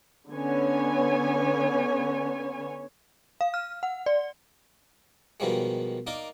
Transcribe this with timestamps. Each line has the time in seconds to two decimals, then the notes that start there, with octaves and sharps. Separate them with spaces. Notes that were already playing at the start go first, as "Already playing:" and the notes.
0.32 D3 B3 C#4 C#5 G#5
3.41 F5
3.54 F6
3.83 F#5
4.06 D5
5.40 B2 D#3 F3 G3 G#3
6.07 A#3 D#4 A#4 D5